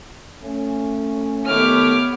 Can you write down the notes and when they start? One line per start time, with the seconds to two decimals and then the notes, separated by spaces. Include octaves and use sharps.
0.43 A3 C#4
1.46 D#3 A3 B3 G4 C#5 D6 F6